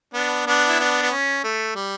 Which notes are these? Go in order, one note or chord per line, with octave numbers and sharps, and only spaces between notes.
B3 D4
B3 D4
E4
B3 D4
B3
C#4
A3
G3